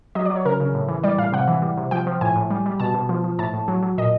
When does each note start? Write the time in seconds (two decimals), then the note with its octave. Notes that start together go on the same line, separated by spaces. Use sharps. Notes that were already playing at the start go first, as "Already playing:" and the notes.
0.15 F#3 D#5
0.25 F#3 D5
0.36 C#5
0.45 C#3 A#4
0.60 C#3
0.74 A2
0.88 E3
1.04 G3 D5
1.18 A2 F5
1.32 C3 F#5
1.48 E3
1.62 G3
1.77 C3
1.91 F3 G5
2.07 F3
2.21 A2 G#5
2.36 A2
2.51 G3
2.66 G3
2.80 B2 A5
2.94 B2
3.09 F3
3.24 F3
3.39 A2 A5
3.53 A2
3.68 F#3
3.82 F#3
3.98 A#2 D#5